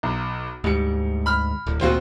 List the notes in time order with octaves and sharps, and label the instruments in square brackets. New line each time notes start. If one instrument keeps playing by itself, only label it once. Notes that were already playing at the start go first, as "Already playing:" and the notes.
[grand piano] B1
[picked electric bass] D2 G#2 [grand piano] G3 C#7
[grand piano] B5 F6
[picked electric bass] D1
[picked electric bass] G#1 D2 A#2 [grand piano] C4 F4 F#4